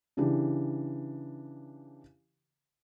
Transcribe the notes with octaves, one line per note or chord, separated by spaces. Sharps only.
C#3 E3 D4 G4